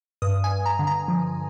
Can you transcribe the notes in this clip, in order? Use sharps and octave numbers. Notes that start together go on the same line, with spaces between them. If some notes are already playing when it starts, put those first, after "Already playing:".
G2 D#6
G#5
G2
A#5
D3
A#5
F3